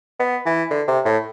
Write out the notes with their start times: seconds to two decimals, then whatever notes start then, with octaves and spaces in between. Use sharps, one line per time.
0.20 B3
0.46 E3
0.71 D3
0.88 C3
1.05 A2